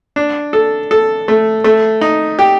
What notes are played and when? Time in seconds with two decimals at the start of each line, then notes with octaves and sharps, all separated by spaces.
0.16 D4
0.53 A4
0.91 A4
1.28 A3
1.64 A3
2.01 D#4
2.39 G4